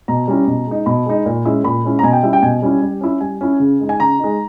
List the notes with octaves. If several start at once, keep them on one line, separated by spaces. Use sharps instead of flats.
B2 A#5
G3 C#4 E4
B2
G#3 D#4
B2 B5
G#3 D#4
A#2
G#3 C#4 E4
A#2 B5
G#3 C#4 E4
A#5
B2 G#5
G5
G3 C#4 E4 E5
G5
B2 G#5
G3 C#4 E4
G3
C#4 E4
G3 G#5
C#4 E4
C#3
G#3 D#4
G#5
C#3 A#5
G#3 D#4